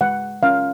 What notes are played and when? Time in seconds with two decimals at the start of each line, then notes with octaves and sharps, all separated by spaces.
0.01 G#3 F#5
0.43 C#4 F4 F5